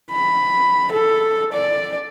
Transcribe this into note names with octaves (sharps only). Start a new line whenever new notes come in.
B5
A4
D5